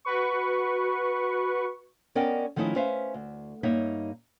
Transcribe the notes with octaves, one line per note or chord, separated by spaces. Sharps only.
F#4 B4 C#6
B3 C#4 A#4 D5 D#5 G5
D#3 F3 A3 C#4 D#4 E4
C#4 B4 C5 E5 F5
D2
G2 A#3 D#4 C#5 D#5 E5